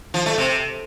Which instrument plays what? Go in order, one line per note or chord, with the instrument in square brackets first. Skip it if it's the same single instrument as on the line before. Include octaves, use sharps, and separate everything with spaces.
[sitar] F3
A3
C3